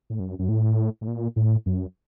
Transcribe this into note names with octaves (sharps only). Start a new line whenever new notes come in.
A2
F#2
F#2
A2
A2
A#2
A2
F#2